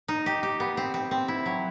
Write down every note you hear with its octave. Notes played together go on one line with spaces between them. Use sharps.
D#4
G4
G4
B3
C4
C4
C4
E4
F#3